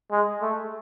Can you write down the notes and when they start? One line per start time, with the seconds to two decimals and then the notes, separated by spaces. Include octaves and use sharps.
0.11 G#3
0.41 A3